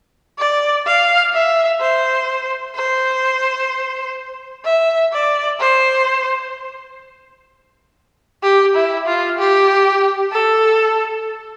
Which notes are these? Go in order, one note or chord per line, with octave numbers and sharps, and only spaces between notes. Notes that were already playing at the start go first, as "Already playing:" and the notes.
D5
F5
E5
C5
C5
E5
D5
C5
G4
E4
F4
G4
A4